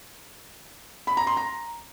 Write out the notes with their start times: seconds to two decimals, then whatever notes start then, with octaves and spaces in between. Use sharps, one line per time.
1.07 B5
1.17 A#5
1.27 C6
1.37 A#5